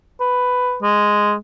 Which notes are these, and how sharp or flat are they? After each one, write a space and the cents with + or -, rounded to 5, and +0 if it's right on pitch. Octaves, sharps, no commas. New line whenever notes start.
B4 +10
G#3 +0